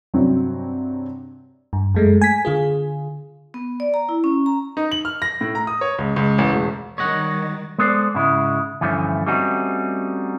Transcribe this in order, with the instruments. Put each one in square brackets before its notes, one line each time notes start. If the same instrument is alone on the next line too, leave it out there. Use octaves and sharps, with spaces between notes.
[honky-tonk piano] G2 C3 F#3 C4
[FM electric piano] G2
F#2 G#3 A3
G#5 B6
D3 F4 G#4
[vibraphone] B3
D5
A#5
E4
C#4
A#5
[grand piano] D#4
F#7
F6
A#6
A2
A#5
D#6
C#5
C#2
C#2
A1
E1
[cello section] D#3 G3 [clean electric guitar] C#5 D#5 F#5
[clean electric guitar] G#3 B3 A4 C5 D5
G#2 C#3 G#3 E4
D2 G2 E3 F3 A3 C#4
G3 A3 C4 C#4 D#4 F#4